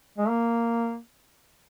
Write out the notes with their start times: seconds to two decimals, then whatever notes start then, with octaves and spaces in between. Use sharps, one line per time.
0.18 G#3
0.29 A#3